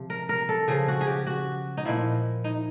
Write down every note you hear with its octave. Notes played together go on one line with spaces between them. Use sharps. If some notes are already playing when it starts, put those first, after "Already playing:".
Already playing: C3 F3
A#4
A#4
A4
C#3 F3 G#4
F#4
G#4
G4
F#4
D#4
A#2 F3 E4
D#4